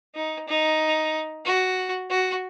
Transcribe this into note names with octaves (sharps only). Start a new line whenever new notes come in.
D#4
D#4
F#4
F#4